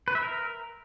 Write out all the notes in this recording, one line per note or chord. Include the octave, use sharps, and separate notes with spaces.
B4
E5
A#4